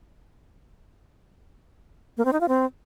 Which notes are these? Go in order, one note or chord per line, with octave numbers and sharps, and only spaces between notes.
A#3
C4
D#4
F4
C4